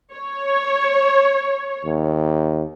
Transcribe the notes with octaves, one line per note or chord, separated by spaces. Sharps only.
C#5
D#2